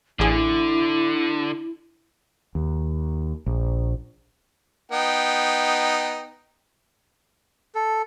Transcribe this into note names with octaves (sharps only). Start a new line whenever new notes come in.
A1 D3 E4 G#4
D#2
A#1
B3 D#4 G5
A4